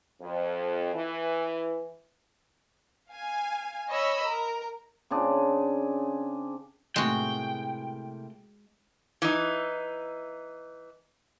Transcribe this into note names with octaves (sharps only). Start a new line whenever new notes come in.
F2
E3
F5 G#5
C#5 D#5 B5 E6
A#4
C#3 C4 D4 G#4
A2 C3 G#3 A#3 F#4 G5
E3 D#4